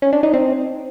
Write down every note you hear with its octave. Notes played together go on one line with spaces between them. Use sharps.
C#4
D4
D#4
C4